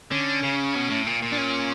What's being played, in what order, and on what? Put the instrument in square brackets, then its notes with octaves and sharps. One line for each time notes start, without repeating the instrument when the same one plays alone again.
[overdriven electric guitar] D3 [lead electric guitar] C#4
[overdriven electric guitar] C#3
B2
A2
A#2
A#2
[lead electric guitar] D4
C#4